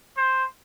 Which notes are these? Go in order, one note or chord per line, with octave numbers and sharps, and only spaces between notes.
C5